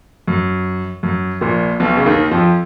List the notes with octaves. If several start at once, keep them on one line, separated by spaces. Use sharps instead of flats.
F#2
F#2
A#1 A#2
B1 B2
C#3
D#2 D#3
F2 F3